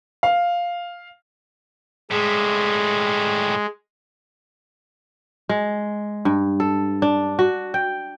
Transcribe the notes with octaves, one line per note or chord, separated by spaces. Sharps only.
F5
A2 G3 G#3
G#3
G2
A4
D4
F#4
G5